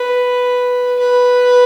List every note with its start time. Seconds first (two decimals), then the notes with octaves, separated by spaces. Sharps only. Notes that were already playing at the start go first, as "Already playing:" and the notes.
Already playing: B4
0.99 B4